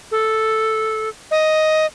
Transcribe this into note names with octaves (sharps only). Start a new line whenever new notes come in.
A4
D#5